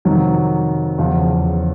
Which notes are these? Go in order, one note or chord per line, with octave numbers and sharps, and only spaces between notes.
F2 C3 D#3 F#3
E2 C#3 F3